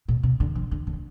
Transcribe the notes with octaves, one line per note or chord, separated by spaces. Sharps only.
A#2
C3
D3
F3
D3
D3